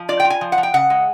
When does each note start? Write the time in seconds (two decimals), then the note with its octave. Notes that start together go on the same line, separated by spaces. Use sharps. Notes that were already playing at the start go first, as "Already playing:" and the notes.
Already playing: F3
0.09 F4 D5
0.20 G5
0.25 F4
0.30 G#5
0.41 F3
0.52 F#5
0.58 F3
0.63 G5
0.74 C#3 F#5
0.90 G#3